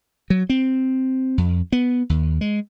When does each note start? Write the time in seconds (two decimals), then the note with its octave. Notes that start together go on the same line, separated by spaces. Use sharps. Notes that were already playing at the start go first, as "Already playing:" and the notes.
0.30 F#3
0.50 C4
1.38 F2
1.72 B3
2.10 D#2
2.41 G#3